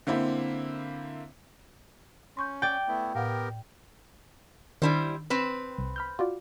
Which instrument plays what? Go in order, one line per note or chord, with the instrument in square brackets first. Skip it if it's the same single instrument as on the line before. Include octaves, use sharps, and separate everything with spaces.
[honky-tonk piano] D3 A#3 C4 E4
[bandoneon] C#4 [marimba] C6 C#6 G6
[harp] D5 G5
[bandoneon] A3 B3 E4
[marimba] A2 F5 F#5 [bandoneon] B3 G4 A#4
[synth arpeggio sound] D#3 D4 [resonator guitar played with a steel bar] G3 E4 C5
[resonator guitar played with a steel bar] C4 B4
[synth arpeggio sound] C2
B5 F6 G6
F4 F#4 D5